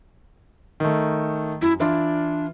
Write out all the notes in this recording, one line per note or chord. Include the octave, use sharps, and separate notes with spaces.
D#3 A3
F#2 E4
E3 D4 E4 F4